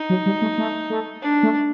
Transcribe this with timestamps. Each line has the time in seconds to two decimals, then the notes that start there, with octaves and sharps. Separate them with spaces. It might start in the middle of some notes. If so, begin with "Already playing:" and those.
Already playing: D#4
0.10 F#3
0.26 G3
0.42 A3
0.58 A3
0.90 A3
1.22 D4
1.43 A3